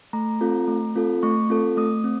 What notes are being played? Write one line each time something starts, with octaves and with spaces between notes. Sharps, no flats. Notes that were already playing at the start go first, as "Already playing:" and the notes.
A3 A#5
C4 F4 A4
A3
C4 F4 A4
A3 C#6
C4 F4 A4
A3 D#6
C4